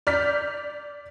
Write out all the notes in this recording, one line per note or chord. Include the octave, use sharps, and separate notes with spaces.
D5 F6 G6 B6